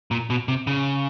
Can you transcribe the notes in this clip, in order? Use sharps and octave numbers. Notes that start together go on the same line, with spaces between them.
A#2
B2
C3
C#3